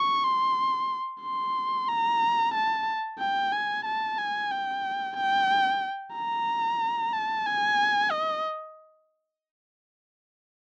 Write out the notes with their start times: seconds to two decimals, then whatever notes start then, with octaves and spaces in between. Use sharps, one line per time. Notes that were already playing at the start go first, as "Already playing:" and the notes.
Already playing: C#6
0.24 C6
1.22 C6
1.88 A#5
2.54 A5
3.19 G5
3.53 G#5
3.86 A5
4.18 G#5
4.51 G5
5.17 G5
6.14 A#5
7.13 A5
7.46 G#5
8.11 D#5